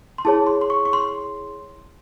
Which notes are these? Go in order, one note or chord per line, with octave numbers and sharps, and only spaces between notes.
C6
E4 G#4 C#5 A5
C6
C6
C#6
C#6
C6